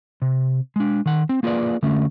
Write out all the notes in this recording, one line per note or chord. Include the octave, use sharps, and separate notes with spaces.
C3
G#3 D4
D#3 F#5
C4
A#3 F4 G#4 B4 D5
D3 A3 C#4